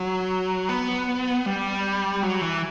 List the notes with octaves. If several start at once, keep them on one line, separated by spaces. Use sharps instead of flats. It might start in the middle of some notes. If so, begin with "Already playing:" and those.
Already playing: F#3
B3
G3
F#3
E3